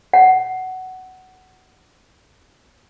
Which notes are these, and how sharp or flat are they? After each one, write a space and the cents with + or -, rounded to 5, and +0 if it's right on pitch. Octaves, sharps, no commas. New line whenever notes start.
F#5 +15